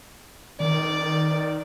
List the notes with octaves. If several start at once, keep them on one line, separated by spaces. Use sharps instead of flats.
D#3 D5